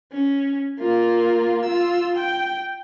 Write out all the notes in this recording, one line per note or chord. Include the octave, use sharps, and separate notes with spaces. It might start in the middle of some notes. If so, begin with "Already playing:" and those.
C#4
A#3 F4
F4 E6
G5